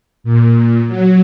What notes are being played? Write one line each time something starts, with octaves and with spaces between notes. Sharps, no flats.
A#2
F#3